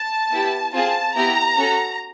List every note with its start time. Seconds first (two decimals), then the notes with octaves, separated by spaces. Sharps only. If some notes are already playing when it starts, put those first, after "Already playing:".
Already playing: A5
0.31 B3 E4 G4
0.73 C4 F4 G#4 A5
1.15 B3 E4 G4 A#5
1.57 C#4 F#4 A4